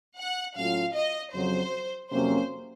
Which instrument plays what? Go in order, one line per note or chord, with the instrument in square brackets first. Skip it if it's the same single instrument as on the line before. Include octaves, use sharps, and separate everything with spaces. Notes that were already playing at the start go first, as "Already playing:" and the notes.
[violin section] F#5
[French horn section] A2 F#3 A3 C#4 F4 [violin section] F5
[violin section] D#5
[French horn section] F2 C#3 F#3 [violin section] C5
[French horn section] F2 C3 F#3 A#3 C#4 [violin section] C5